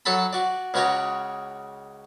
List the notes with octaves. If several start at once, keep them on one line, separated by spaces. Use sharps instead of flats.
F#3 A4 A5 B5
F#4 D5
C#2 C#3 F#4 C#5 D5 A#5